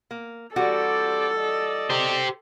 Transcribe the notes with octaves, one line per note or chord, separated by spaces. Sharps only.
A#3
E3 G3 C4 F#4 G4 A4 D5
D5 D#5
G4 C5